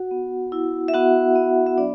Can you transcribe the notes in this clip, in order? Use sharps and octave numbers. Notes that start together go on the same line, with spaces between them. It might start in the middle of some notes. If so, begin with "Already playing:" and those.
Already playing: F#4 F#5
B3
E4
E5
B3 F#4 F#5
B3
E5
F#3 D4 D5